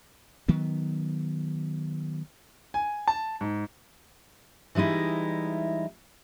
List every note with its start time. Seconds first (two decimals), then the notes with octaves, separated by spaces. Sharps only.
0.48 D#3 F#3 B3
2.74 G#5
3.08 A5
3.41 G#2
4.75 E3 G3 G#3 D#4 E4